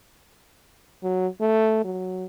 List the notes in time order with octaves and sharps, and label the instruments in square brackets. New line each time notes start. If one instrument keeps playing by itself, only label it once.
[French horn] F#3
A3
F#3